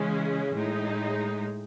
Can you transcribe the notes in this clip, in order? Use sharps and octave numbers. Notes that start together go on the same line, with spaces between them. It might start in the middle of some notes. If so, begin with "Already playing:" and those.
Already playing: C#3 E3 G#3 C#4
A2 G#3 D#4